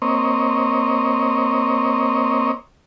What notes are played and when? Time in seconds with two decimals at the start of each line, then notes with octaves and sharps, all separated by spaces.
0.02 A#3 C4 C#5 D#5